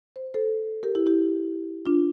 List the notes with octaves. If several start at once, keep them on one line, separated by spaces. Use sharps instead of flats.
C5
A4 C5
G4 A#4
E4 G4
E4 G4
D4 F4